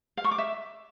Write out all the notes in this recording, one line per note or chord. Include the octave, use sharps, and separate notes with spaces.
F5
C#6
D6
E5